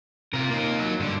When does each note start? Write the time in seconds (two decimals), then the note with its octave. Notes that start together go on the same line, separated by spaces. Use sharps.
0.33 C3 F4 A#4
0.50 A#3 D#4
0.79 F#3
1.00 G2 D3 D4